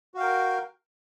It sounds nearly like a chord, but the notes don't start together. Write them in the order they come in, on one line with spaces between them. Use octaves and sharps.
F#4 F5 G5 A#4